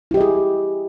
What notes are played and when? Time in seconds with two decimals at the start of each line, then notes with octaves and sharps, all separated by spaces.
0.11 E4
0.14 G4
0.17 D#5
0.21 G#4